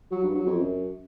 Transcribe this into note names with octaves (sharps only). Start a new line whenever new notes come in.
F#3
G2
F#3
F2
F#2